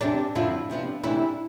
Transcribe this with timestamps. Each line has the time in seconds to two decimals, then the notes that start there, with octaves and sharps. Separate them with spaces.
0.01 E2 C3 G3 C4 D4
0.35 F2 D3 F3 C4 E4 F4
0.70 C3 F3 B3 D4
1.04 C3 E3 A3 D4 E4